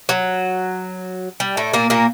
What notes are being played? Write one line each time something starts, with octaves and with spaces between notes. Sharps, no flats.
F#3
G3
A2 A3
A#2 A#3
A#2 A#3